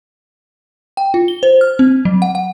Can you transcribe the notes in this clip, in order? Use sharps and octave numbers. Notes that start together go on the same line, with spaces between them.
G5
F4
G7
C5
F6
C4
F#3
F#5
F#5